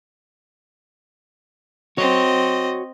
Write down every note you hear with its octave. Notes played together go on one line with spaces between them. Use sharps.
C4 F#4 C#5 D#5